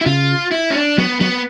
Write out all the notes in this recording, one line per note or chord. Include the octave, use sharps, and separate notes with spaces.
E4
C#3 F4
E4
C#4
D4
F#3 B3
F#3 B3